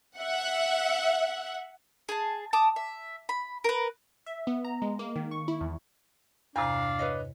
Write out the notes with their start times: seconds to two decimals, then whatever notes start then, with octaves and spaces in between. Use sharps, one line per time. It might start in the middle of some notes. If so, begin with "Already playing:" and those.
0.17 E5 F#5
2.09 G#4 A5
2.53 A5 D6 D#6
2.76 E5
3.29 B5
3.64 A#4 B4
4.26 E5
4.47 B3
4.65 A#5
4.82 G#3
4.99 A#3
5.16 D#3
5.31 C#6
5.48 E4
5.61 E2
6.56 E2 G2 C3 D4 F5 A#5
6.99 B4 C#5 D#5